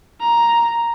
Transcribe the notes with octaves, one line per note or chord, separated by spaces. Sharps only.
A#5